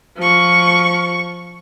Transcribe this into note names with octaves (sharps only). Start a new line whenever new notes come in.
F3 C#6